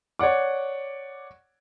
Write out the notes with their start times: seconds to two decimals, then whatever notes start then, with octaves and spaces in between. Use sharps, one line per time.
0.19 C#5 D5 F#5 D6